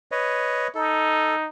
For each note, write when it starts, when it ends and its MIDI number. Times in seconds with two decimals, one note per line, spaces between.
0.12 0.68 71
0.12 0.68 73
0.12 0.68 75
0.75 1.49 63
0.75 1.35 69